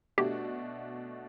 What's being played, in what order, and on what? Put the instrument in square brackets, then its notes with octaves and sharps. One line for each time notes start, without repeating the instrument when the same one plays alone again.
[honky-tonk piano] B2 A3 D4 F#4 [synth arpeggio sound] G4